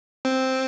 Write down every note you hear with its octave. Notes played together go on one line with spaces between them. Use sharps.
C4